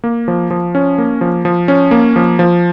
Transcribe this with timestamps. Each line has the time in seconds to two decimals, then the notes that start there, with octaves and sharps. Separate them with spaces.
0.04 A#3
0.28 F3
0.51 F3
0.75 C#4
0.98 A#3
1.21 F3
1.45 F3
1.68 C#4
1.91 A#3
2.16 F3
2.39 F3